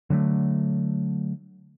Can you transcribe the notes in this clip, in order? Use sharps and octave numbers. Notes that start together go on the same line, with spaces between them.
D3 F#3 G3 A3